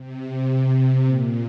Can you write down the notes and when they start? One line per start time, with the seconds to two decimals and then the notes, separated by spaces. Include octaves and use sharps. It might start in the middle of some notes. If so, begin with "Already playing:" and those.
Already playing: C3
0.49 C3
1.07 A#2